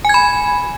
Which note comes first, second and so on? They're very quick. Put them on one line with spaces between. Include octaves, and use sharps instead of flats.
G#5 G#6 B5